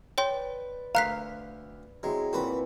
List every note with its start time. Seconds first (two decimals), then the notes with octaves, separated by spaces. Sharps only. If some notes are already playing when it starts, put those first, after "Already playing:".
0.18 B4 C#5 D5 G5 C6
0.95 D2 F5 A#5 F#6 B6
2.03 F#3 G#3 C4 E4
2.33 A#2 E3 C4 F#4 B4